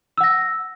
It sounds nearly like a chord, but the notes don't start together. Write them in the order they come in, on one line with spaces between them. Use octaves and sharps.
E6 F#5 A#6